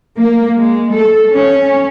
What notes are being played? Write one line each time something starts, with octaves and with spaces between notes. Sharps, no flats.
A#3
G#3
A4
C#4